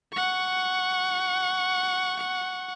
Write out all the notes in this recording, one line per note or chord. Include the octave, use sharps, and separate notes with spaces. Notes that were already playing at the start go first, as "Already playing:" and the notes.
F#5 C#6